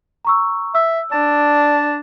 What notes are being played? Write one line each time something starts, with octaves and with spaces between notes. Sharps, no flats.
A#5 C#6 E6
E5 E6
D4 A5